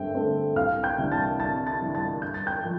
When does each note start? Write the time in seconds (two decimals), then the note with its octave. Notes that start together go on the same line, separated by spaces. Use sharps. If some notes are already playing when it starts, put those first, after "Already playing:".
Already playing: G2 D3 A3 C4 E5 G5
0.15 D3 A3 C4
0.56 C2 F5 F6
0.83 G5 G6
0.98 C3 E3 G3 D4
1.12 A5 A6
1.39 C2 A5 A6
1.67 A5 A6
1.81 C3 E3 G3 D4
1.95 A5 A6
2.22 G2 G6
2.34 A6
2.47 G5 G6
2.64 F3